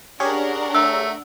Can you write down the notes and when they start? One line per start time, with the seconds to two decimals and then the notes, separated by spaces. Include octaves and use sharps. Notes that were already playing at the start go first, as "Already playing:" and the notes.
0.20 C#4 D4 G4 G#4 A#4 C#5 F#5
0.75 A3 E6